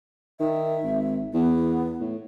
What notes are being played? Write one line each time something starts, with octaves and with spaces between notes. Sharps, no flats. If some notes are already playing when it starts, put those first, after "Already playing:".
D#3 E5
G#1
E2 B3
A2